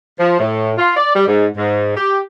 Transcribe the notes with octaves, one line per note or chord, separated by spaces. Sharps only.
F3
A2
F4
D5
G3
G#2
G#2
G4